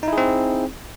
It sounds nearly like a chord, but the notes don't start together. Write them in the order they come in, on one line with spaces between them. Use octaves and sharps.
D#4 E4 G#4 C4